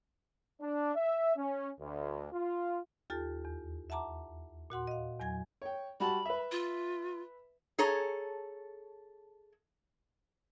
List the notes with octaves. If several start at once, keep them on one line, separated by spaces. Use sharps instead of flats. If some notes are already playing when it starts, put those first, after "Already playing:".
D4
E5
C#4
D2
F4
D#2 F4 G4 A4 A5 A6
E2
E5 F#5 A5 A#5 D6
A#2 F#4 F#5 C6
D#5 F5
E2 F#3 G#5 G#6
C#5 G5
G3 F#4 A5 B5
B4 E5
F4
G#4 A4 C#5 A#5